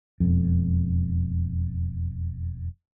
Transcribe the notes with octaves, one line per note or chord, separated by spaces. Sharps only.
E1 F2